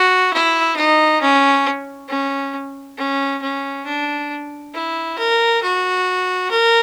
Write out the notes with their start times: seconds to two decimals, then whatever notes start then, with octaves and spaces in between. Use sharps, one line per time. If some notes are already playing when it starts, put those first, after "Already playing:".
Already playing: F#4
0.33 E4
0.77 D#4
1.22 C#4
2.09 C#4
2.98 C#4
3.42 C#4
3.86 D4
4.74 E4
5.18 A#4
5.63 F#4
6.51 A#4